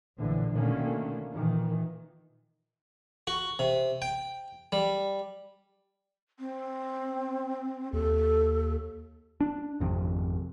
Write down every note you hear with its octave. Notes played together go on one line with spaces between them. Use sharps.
A#1 A2 D3 E3
B2 D3 D#3 A3 A#3 C#4
A#2 D#3 E3
F#4
C3
G5
G3
C4
D#2 A4
D4
G#1 F2 C3